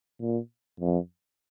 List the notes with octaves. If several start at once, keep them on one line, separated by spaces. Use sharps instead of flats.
A#2
F2